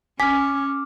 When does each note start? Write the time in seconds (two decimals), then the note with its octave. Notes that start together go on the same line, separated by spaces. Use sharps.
0.20 C#4 G#5 D6 F6 B6